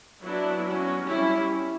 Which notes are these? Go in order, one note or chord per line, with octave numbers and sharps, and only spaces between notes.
F#3 B3 D4 E4
F#3 C#4
G3 C#4 E4